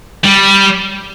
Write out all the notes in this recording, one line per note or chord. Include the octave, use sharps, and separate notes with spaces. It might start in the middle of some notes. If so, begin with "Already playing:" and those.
G3